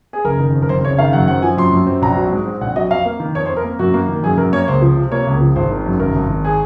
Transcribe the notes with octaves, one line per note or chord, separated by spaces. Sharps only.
G#4
F#1 A#4
D#3
F2
A#4
F#1 C5
F#1 C#5
D#3 F5
F#2 F#5
C4 F#5
F3 G#5
F#2 C6
F#2
C4
A#1 A#5
F#3
G#2
C4
A#1 F#5
F#3 D#5
F2 F5
A#3
D#3
F2 C#5
C5
F2
A#4
A#3
F#2 F#4
A#3
D#3
F#2 G#4
F#2 A#4
A#3 C#5
C#2 C5
F3
C3
A#3 C#5
C#2
F3
G#1 C5
D#3
F#2
G#1 A#4
G#1
D#3
G#4